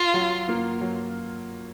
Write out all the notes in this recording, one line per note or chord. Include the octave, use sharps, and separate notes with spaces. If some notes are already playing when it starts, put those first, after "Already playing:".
Already playing: F4
F#3
A#3 F4
F#3